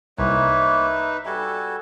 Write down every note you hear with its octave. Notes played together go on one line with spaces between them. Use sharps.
C2 A#3 D#4 B4 C#5 E5
G3 F#4 A4 G#5